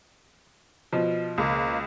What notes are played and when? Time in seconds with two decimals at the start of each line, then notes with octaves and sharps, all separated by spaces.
0.93 B2 F3
1.38 C#2 A#3